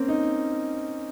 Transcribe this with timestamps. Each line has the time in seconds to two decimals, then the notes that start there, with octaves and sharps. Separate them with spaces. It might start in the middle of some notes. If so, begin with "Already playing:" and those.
Already playing: A#3 C4 C#4
0.08 D#4